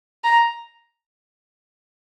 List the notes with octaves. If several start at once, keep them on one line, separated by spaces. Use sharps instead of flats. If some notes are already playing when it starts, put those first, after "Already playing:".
A#5